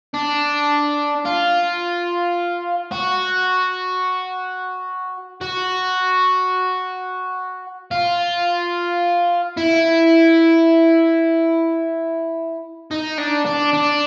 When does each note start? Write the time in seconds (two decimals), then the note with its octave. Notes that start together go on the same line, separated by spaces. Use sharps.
0.14 D4
1.25 F4
2.92 F#4
5.41 F#4
7.91 F4
9.57 E4
12.91 D#4
13.18 D4
13.46 D4
13.73 D4